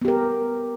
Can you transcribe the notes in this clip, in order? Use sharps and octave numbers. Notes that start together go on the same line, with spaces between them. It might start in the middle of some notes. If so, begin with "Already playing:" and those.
B3 G4 A#4